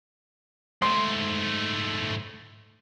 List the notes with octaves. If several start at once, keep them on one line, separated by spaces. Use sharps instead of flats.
G#2 A3 C6